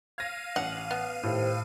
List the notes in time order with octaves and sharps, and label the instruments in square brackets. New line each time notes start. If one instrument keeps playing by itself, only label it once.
[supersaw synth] F5 D#7 [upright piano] G#6 A#6
[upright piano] A1 F7 [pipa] F#5
[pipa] B3
[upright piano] A2 [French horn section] D#3 G4 C5